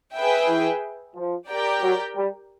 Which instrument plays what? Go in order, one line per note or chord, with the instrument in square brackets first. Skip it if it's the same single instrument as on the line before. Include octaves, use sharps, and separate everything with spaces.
[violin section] G#4 B4 E5 G5
[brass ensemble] E3
F3
[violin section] G4 A#4 D5 G5
[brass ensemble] F#3
G3